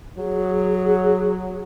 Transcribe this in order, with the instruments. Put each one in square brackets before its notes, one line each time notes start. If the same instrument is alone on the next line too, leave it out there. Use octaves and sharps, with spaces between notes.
[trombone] F#3 [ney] G#4